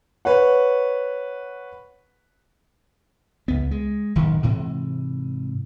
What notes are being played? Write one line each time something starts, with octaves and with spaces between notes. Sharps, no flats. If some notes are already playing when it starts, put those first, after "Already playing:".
B4 C#5 F#5
C#2 B3
G#3
D1 B1 F#2 D#3
G#2 C3 E3